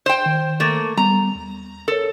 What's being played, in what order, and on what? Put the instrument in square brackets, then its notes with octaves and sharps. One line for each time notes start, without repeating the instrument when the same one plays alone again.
[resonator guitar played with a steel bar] C5 G5
[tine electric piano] D#3
[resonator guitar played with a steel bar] A3 A#3
[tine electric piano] G3 B3 [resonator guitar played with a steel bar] A#5
[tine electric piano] D#2
[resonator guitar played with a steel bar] A4 [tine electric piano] A#4 C#5